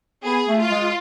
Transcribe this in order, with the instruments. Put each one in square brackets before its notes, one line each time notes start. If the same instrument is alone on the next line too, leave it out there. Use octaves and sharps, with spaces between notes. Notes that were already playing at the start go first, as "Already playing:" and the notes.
[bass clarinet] B3 [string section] G#4
[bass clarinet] A3
[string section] F4
[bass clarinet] G#3